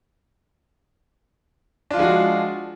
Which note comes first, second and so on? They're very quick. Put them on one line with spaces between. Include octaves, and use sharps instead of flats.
D4 F4 F3 G#3 F#4